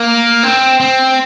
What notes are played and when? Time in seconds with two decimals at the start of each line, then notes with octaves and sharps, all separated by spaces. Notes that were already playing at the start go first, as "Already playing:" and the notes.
Already playing: A#3
0.43 C4
0.80 C4